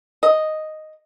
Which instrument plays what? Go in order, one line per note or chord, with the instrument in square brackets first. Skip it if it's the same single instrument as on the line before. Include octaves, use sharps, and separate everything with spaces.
[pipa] D#5